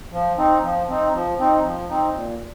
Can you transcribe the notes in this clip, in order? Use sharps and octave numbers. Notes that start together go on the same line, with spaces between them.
F3
C4 D#4
F3
C4 D#4
F3
C4 D#4
F3
C4 D#4
A#2